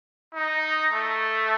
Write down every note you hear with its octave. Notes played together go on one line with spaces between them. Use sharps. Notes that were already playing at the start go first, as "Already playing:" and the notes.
D#4
A3